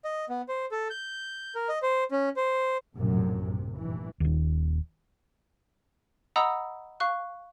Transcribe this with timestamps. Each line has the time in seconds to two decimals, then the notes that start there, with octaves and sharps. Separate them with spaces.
0.05 D#5
0.29 B3
0.49 C5
0.72 A4
0.90 G6
1.55 A#4
1.69 D#5
1.82 C5
2.11 C#4
2.37 C5
2.98 A#1 F#2 A2 C3
3.40 C3
3.80 F1 G2 A#2 E3
4.20 D#1 D#2
6.36 D#5 F#5 A#5 B5 D#6 E6
7.00 F5 C#6 F#6